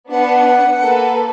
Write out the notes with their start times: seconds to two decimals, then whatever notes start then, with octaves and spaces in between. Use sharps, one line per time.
0.10 B3 D4 B4 F#5
0.82 A#3 A4 B4